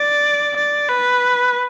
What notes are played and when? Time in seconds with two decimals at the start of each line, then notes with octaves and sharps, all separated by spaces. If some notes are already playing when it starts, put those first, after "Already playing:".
Already playing: D5
0.56 D5
0.88 B4